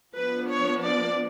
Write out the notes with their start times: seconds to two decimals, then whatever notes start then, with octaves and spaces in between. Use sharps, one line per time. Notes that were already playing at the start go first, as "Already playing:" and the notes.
0.15 F3 B3 D4 B4
0.49 C#5
0.82 D5